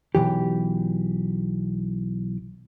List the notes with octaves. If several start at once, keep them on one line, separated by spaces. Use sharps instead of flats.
B1 F2 E3 G4